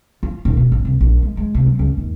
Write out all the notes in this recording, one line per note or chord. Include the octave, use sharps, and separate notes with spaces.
F4
D#1
B2
A1
C2
A#1
G#3
G#3
C3
F#3
C#2
D#2